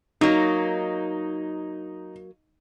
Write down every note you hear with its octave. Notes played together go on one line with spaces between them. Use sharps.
F#3 A#3 D#4